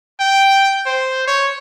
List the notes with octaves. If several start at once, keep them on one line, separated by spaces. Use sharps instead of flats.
G5
C5
C#5